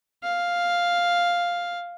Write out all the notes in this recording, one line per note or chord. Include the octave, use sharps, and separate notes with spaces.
F5